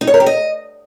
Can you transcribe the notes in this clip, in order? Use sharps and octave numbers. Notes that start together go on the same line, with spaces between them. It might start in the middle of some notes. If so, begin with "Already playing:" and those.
D#4
C#5
A#4
G4
D#5